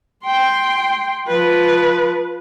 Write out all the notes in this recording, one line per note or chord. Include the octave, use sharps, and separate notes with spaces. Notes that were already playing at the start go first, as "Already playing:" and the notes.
G5 C6
F3 B4